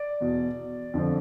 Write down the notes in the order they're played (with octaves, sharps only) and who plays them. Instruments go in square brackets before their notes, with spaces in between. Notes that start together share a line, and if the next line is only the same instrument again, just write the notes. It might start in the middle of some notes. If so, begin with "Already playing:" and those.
Already playing: [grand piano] D5
E2 B2
F2 D3 F3